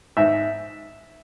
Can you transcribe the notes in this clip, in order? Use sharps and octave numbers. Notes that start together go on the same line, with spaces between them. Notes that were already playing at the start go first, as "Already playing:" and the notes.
G#2 E5